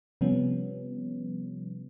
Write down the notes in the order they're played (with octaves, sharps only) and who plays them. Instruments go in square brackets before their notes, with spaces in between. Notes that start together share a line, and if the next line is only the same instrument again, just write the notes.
[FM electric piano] C3 F3 G3 B3 C#4